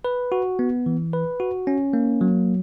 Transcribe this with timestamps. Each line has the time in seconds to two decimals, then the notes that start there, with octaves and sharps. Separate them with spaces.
0.05 B4
0.32 F#4
0.59 B3
0.86 E3
1.13 B4
1.40 F#4
1.67 C#4
1.93 A#3
2.21 F#3